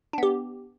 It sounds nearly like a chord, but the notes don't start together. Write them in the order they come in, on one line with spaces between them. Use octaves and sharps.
D4 B3 G4